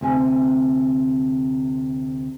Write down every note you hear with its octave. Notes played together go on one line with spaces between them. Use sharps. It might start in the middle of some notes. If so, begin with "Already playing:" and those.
D2 C3 G#5